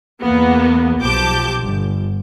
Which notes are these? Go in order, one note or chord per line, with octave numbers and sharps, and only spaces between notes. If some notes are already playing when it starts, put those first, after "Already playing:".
E2 A#3 B3
B1 F3 G4 A5 D6 G6
G1